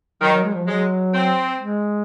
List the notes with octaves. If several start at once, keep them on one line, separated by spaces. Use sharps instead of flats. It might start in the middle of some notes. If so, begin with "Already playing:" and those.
D#3 F#3
F#3
G#3
F3
F#3 G#3
C4
G#3